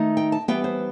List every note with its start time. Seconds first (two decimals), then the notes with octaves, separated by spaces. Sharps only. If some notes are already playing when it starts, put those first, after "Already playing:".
Already playing: D#3 A3 D#4
0.17 G5
0.32 A5
0.48 E3 G3 B3 G5
0.64 C5